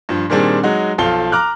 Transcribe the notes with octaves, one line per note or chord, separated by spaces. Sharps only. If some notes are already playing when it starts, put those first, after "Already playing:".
G2 F3
A#2 D#3 G3 C4 D4 G#4
F#3 G#3 D#4 F#4
B1 F3 A4 F5 G7
A#5 D6 F6 F#6